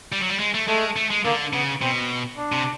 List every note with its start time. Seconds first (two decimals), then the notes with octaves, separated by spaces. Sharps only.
0.12 G3
0.21 F#3
0.29 G3
0.40 G#3
0.54 A3
0.68 G#3 A3
0.96 A3
1.10 G#3
1.25 D3 A#3
1.53 C#3 B3
1.81 B2 C4
2.37 D4
2.52 C3